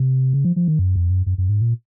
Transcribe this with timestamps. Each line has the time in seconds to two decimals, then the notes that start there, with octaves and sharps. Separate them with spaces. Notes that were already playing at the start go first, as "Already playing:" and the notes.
Already playing: C3
0.33 C#3
0.45 F3
0.56 F3
0.68 D#3
0.79 F#2
0.96 F2
1.10 F#2
1.26 F#2
1.38 F#2
1.49 G#2
1.61 A#2